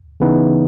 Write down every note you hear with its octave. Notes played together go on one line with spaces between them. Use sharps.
C#3 E3 B3 D#4